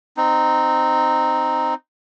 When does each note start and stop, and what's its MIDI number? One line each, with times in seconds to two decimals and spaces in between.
0.17 1.74 60
0.17 1.74 63